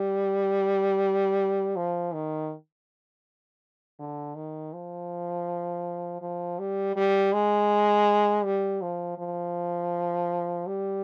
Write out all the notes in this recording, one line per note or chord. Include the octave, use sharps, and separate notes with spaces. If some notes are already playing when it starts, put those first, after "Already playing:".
Already playing: G3
F3
D#3
D3
D#3
F3
F3
G3
G3
G#3
G3
F3
F3
G3